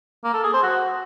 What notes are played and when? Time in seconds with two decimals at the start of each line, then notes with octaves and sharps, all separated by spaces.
0.24 A#3
0.34 A4
0.44 G#4
0.53 C5
0.63 F#4